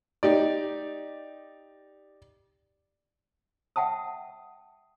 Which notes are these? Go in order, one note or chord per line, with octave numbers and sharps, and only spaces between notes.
D#4 G4 D5
E5 F#5 G5 A5 D#6